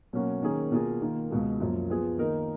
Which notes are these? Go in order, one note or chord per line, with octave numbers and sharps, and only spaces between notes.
B2 F#3 A#3 C#4 F#4
D#3 A#3 C#4 G#4
B2 A#3 F4 G#4
D#3 A#3 F4
C#2 B2 G#3
F#2 F3 A#3
F3 B3 F4 G#4
D#3 A#3 D#4 A#4